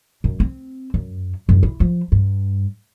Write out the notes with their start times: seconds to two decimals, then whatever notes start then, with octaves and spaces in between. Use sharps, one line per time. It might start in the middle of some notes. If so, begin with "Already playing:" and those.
0.24 F#2
0.40 C4
0.94 F#2
1.49 F#2
1.63 E4
1.80 F3
2.12 G2